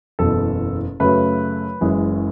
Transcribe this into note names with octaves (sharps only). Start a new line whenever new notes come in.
F#1 E2 B2 A4
F#2 C#3 F#3 A3 B4
F#1 F#2 E3 G#3